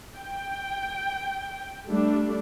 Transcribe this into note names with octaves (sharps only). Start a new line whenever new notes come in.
G5
G3 A3 D4